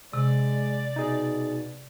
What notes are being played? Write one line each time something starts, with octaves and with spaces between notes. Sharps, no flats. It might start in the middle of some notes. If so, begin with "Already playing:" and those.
C3 G#3 D5
B2 D#4 G#4